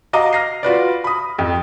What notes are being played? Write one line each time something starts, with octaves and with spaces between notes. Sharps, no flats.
F#4 D#5 F5 A#5 D6
F6 A#6 C7
F4 F#4 B4 D5
B5 D#6
F2